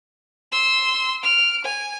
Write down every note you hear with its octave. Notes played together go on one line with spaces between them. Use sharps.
C6 E6
F6 D7
G#5